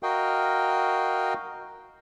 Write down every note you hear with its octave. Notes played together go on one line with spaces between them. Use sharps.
F#4 A#4 D#5 F5 G5